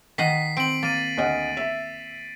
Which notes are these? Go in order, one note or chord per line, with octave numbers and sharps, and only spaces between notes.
D#3 D#5 F#5 B6 C7
C4 D7 F#7
A#3 A6 D#7
D2 D#5 F#5
E5